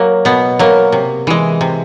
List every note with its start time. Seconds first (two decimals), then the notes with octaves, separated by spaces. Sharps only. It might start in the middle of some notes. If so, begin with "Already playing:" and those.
Already playing: F#3 A#3
0.25 B2 B3
0.59 F#3 A#3
0.92 C3
1.27 E3 G#3
1.61 C3